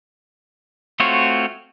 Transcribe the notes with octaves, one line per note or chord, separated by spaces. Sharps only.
A3 C4 F4 F#4 C#5